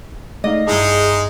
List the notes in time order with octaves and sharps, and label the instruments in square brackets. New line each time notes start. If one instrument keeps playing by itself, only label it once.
[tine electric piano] G#3 A3 D#4 [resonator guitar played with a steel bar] D#5 [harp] F5 D6
[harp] G2 E4 [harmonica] G#3 D#4 [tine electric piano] G#4 A5 D#6